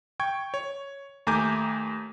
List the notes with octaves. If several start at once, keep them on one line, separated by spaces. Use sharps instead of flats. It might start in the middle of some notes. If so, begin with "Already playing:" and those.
G5 C#6 G#6
C#5
D#2 A3 G#5 A#5 D6 G6